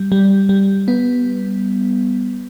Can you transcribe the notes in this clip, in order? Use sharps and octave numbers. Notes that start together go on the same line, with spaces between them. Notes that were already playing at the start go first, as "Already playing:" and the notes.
Already playing: G3
G3
G3
B3